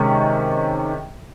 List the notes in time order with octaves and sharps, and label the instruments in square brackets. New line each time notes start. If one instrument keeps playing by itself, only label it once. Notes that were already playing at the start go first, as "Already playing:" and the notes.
Already playing: [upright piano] C3 D#3 G#3 C#4